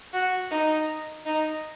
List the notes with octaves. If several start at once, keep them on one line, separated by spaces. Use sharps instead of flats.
F#4
D#4
D#4